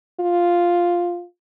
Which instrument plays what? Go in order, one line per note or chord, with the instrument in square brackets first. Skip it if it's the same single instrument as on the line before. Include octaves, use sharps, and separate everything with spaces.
[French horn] F4